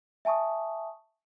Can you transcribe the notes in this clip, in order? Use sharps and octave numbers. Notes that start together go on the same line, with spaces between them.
E5 G#5 A5 C#6 D#6